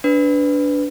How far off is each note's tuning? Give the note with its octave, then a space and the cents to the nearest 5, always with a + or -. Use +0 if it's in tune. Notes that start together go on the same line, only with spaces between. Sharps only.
D4 -15 B4 +10